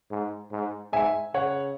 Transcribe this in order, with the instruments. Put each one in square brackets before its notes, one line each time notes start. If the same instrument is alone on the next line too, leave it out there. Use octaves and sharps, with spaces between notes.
[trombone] G#2
G#2
[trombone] G#2 [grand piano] E5 G#5
[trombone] C#3 [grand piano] C#5 F#5